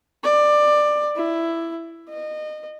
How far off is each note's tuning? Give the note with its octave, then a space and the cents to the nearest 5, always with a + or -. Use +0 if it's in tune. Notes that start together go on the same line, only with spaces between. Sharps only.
D5 +15
E4 +10
D#5 -25